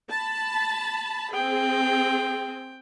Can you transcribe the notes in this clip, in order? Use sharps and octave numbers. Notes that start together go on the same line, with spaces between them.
A5 B5
C4 G#4 G5